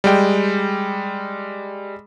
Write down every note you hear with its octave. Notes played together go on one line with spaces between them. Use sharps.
G3 G#3 G5